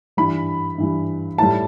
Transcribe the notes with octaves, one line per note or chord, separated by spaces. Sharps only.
G2 E3 G3 B5
G2 E3 G3
A2 G3 A5